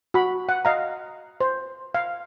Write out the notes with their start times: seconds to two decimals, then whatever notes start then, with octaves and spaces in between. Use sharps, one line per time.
0.14 F#4 B5
0.49 F#5
0.65 D#5 F5 A#5
1.41 C5
1.94 F5